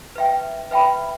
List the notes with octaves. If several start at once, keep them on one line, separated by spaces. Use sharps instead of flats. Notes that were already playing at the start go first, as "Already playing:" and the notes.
B4 E5 G5
B4 E5 G5 B5